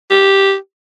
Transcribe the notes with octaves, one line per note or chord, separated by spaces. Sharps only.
G4